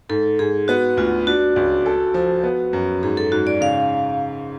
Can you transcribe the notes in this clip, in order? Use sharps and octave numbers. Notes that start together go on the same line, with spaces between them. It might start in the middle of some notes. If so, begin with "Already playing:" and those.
G#2 A4
G#2 G#4
B3 F#4
D2 F4
D4 F#4
C#2
A4
F3
B3
F#2
G#2 G#4
A4
G#2 F#4
D5
C#3 F5